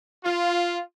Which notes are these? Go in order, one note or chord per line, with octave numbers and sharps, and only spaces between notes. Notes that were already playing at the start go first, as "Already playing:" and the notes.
F4